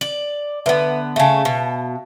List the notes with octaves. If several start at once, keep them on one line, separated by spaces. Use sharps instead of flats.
D5 F#7
D3 B3 B4 E5
C#3 A3 E5 F5 A5
B2